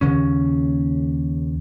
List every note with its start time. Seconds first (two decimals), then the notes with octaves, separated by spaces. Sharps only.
0.01 D#2 C#3 C#4